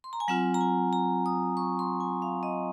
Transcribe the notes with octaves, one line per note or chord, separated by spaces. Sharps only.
C6
A#5
G#5
F#3 C4 F4 F#5
A#5
G#5
A#5
D#6
C#6
C6
G#5
F5
D#5